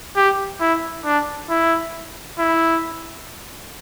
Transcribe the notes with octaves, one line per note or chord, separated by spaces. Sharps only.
G4
E4
D4
E4
E4